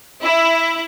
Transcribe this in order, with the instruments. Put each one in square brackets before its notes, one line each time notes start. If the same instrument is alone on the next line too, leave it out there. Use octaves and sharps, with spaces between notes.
[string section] E4